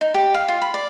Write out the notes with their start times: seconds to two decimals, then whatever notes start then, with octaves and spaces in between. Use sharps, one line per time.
0.01 D#4
0.14 G4
0.34 F5
0.48 F4
0.62 B5
0.74 D5